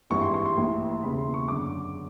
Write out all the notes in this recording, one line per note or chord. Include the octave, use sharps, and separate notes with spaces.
G#1 G2 E3 C#6
C6
C#6
C6
A#1 A2 E3
E1 D#2 C#3 E3 B5
C6
C#6
G1 F#2 D3 D6